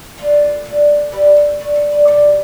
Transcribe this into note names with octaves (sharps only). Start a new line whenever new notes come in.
D3 A3 D4 F4 A4
D3 A3 D4
D3 A3 D4 G4 B4
A4 C5
D3 A3 D4 B4 D5
A4 C5
B4 D5
B2 G3 D4 A4 C5